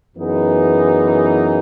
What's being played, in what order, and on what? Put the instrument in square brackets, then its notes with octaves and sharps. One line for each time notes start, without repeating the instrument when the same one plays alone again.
[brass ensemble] F#2 E3 B3 D#4 G#4